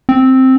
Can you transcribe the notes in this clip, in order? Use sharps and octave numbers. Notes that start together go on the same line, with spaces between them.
C4